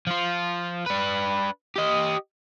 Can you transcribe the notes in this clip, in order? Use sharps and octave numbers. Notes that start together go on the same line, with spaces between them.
F3 F4
D4 B4
G4 D#5